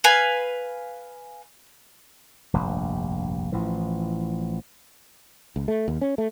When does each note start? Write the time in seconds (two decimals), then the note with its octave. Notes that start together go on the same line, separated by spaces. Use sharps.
0.04 B4 F5 G#5
2.53 F1 A#1 G2
3.52 A1 A2 E3 F3
5.56 C#2
5.68 A3
5.88 D#2
6.01 C#4
6.18 A3